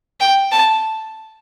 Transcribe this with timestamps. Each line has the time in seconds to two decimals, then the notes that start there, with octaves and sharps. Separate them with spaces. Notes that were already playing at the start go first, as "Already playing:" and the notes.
0.20 G5
0.52 A5